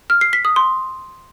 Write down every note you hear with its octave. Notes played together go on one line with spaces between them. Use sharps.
F6
C7
B6
D#6
C6